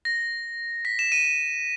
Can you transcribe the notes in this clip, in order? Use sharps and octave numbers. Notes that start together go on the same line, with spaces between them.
A#6
B6
E7
D#7
D#7